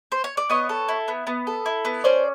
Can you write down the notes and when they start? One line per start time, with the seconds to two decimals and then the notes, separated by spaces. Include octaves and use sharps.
0.12 C5
0.24 C#5
0.37 D5
0.50 B3 C#5 D#5
0.69 A4
0.89 E4
1.08 B3
1.27 B3
1.47 A4
1.66 E4
1.85 B3
2.04 C#4 C5 D5